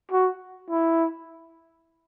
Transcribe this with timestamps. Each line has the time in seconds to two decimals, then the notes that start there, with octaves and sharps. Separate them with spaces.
0.11 F#4
0.70 E4